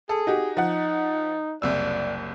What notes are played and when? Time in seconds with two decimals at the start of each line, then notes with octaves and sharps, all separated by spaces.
0.09 G#4 A4
0.27 D#4 F#4 G4
0.57 F3 D#4 F#5
1.62 F#1 C2 D5 E6